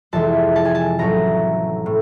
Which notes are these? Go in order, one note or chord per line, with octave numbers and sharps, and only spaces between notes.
F2 C3 E3 G#3 A5
A5
G#5
A5
A1 A2 F#3 A3 C#4 A#5
A2